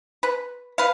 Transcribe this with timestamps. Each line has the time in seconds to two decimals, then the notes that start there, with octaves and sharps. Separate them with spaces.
0.23 B4
0.78 B4 F5